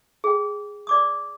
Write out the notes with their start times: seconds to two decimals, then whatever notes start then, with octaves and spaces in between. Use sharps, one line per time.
0.24 G#4 G5
0.87 D5 D6 D#6